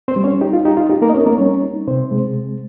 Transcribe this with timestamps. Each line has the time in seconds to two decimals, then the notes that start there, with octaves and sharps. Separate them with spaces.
0.08 C4 C5
0.16 G3
0.24 C#4 C#5
0.41 D#4 G4
0.53 F4
0.65 D#4 G4
0.77 F4
0.89 D#4 G4
1.02 A#3 A#4
1.10 D#5
1.14 C4 C#4 C#5
1.26 A#3 A#4
1.38 G3 C#4 C#5
1.64 D#4
1.87 C3 C4 C5
2.11 G#3